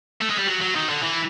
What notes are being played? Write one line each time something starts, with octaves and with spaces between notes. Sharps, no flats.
A3
G#3
G3
F#3
F#3
D#3
D3
E3